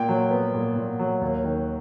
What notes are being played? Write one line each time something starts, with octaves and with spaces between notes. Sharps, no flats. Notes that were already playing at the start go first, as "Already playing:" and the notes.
Already playing: A#2 G5
F#3
B3
A#2
A#2
F#3
D#2
D#3